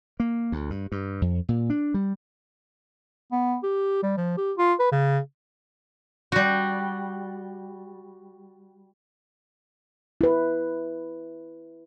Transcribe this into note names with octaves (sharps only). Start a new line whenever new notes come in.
A#3
D2
G2
G2
F2
A#2
D4
G3
B3
G4
G3
F3
G4
F4
B4
C#3
G3 F#4
E4 B4